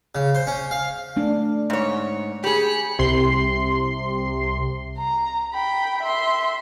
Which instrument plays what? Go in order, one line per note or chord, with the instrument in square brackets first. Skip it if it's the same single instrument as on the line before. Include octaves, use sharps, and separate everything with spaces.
[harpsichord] C#3
C5
C#4
F5
[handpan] A3 D4
[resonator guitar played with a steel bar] G#2 C#5
[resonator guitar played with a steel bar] G4 G#4 [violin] B5 C#7
[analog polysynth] C2 C3 C6 C7
[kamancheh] A#5
G5 B5
E5 C6